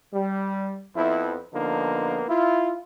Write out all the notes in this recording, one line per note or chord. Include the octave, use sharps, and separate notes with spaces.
G3
F2 F3 B3 E4
D3 F3 A#3 B3 D#4
E4 F4